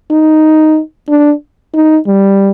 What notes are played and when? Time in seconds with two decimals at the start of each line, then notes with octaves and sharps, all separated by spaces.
0.10 D#4
1.09 D4
1.74 D#4
2.07 G3